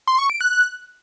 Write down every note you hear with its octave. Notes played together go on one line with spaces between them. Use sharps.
C6
C#6
D7
F#6